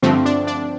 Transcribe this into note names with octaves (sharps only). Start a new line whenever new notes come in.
G2 D3 F3 A3 C4
D4
D4